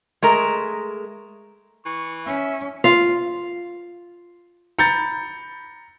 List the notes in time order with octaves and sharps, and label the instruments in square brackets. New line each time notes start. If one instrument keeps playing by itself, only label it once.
[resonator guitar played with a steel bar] G#3 A3 A#4
[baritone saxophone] E3 [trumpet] C#6
[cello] C#4 [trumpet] E5
[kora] F4 F5
[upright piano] A#5 A6 [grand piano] B5 G6 C#7